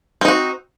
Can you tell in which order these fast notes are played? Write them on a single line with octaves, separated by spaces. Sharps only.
C4 D#4 F#4